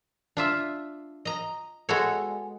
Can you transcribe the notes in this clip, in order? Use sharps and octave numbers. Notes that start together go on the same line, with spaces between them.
D4 F4 E5
D#5 A#5
G#3 B3 F#4 A4 C#5